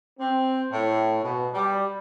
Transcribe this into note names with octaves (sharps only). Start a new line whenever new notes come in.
C4
A2
B2
G3